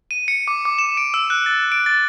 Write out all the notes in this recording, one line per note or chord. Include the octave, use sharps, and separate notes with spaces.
D#7
C#7
D6
D6
E7
D7
E6
F#6
A6
D7
A6